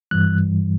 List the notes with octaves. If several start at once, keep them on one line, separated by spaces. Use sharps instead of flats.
G2 E3 G3 F#6